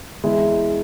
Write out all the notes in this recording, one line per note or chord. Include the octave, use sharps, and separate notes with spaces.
E2 E3 G#3 E4